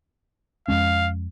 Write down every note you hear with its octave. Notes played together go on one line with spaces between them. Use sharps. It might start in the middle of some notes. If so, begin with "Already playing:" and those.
F2 G#3 C#4 F5